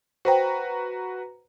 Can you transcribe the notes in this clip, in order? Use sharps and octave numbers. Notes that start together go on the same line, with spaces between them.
F#4 B4 C5 G5 A#5